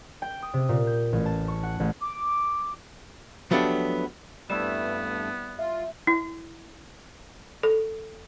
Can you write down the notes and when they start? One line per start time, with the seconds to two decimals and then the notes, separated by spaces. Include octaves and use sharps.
0.22 G5
0.42 D#6
0.53 C3
0.69 A#2
0.87 G6
1.13 A1
1.26 A5
1.48 C#6
1.63 F#5
1.80 A1
2.02 D6
3.51 F3 F#3 A3 B3 D4 G4
4.50 G2 G3 A3 B3 C4 E4 E7
5.59 F4 E5
6.07 E4
7.63 A4